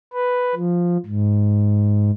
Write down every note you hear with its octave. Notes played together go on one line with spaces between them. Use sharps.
B4
F3
G#2